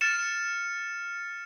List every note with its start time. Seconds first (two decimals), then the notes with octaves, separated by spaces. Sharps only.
0.01 F6 A6 C#7 E7